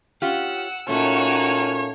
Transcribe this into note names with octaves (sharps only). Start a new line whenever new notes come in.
C#4 F4 G4 F#5 E6
A#2 A3 A#3 C#4 D#4 F#4 C#5